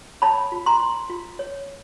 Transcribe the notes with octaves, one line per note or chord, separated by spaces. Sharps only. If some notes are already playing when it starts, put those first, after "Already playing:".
C#5 A5 B5
F4
A#5 C6
F4
F4
C#5